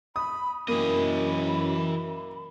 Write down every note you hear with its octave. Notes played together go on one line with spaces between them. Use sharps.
B5 D#6
F#2 E3 A#3 D#5 B5